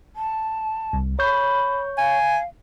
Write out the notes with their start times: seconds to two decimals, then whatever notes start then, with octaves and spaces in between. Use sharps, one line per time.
0.16 A5
0.93 C2
1.19 C#5 B5 C#6 G6
1.98 F5 G#5